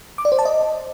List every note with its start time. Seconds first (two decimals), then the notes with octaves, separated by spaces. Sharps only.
0.18 D6
0.25 D5
0.32 C5
0.39 A5
0.45 D#5